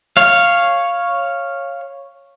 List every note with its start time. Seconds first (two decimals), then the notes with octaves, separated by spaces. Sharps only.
0.17 C#5 F5